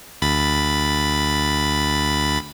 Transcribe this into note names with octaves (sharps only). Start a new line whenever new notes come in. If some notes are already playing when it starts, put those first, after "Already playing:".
D2 B5 A6